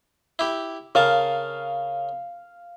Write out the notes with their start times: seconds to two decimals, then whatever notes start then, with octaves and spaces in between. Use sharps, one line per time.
0.39 E4 G4
0.95 C#3 A#4 F5 A5